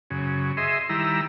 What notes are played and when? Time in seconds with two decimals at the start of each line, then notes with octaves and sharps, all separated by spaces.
0.10 F#2 C#3
0.57 G#4 D#5 E5 C6
0.89 D#3 G3 E4 A#5 E6